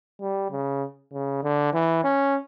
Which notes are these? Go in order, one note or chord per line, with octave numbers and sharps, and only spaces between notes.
G3
C#3
C#3
D3
E3
C#4